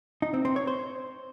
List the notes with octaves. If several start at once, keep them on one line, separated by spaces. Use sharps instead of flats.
D#4
C4
C4
C#5
C5